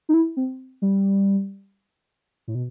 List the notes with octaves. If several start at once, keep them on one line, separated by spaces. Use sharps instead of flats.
D#4
E4
C4
G3
A2
B2